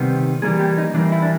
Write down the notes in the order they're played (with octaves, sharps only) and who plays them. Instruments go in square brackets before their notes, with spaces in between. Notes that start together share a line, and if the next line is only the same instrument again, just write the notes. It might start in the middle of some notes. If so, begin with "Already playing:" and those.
Already playing: [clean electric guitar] C3 D#3 G3 B3
E3 G3 A#3 G#4
G4
D#4
E3 D4
G3 A#3
E4
D4